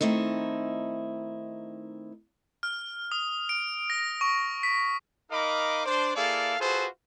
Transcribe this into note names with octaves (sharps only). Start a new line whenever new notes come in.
D#3 A3 C4 D#4 E4
F6
D#6
D7
A#6
C#6
B6
D#4 A#4 D#5 F5 B5 D6
D4 C5 D5
A#3 E4 G#4 A4 D5 F5
F4 F#4 G#4 A4 B4 C5